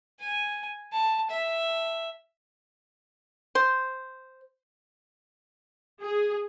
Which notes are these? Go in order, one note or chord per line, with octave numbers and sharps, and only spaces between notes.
G#5
A5
E5
C5
G#4